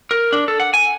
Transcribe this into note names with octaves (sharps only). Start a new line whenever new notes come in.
A#4
D4
A4
F#5
G#5